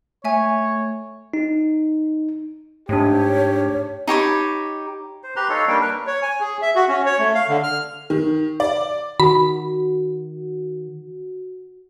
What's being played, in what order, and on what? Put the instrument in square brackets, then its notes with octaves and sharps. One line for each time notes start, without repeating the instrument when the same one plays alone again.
[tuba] A3 [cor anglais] C#5 [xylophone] E5 G#5
[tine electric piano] D#4
[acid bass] G#2 [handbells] A3 D4 [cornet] G4 [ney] C#5
[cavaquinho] D#4 G4 C#5 B5
[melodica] C5
G4 B4 A#5 C6
D#4 A4 C#5 F5
G3 A#3 D4 G5
A#4 B4
[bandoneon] C#5
G#5
G#4
E5
F#4
C#4
C#5
A3
F5
D3
F6
[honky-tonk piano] D#3
D5
[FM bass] D#3 [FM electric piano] F#4 [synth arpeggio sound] B5